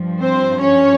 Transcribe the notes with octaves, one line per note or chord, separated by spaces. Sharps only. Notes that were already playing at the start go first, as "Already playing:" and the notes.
Already playing: G2 F3
C4 C5
C#4 C#5